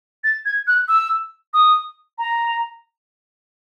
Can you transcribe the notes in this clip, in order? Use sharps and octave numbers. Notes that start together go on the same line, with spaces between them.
A6
G#6
F#6
E6
D#6
A#5